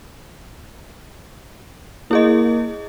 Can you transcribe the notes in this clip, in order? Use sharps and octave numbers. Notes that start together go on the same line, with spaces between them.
A#3 E4 G#4 D#5